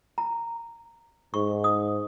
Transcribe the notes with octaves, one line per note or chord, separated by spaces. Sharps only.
A#5
G#2 C#6
D#6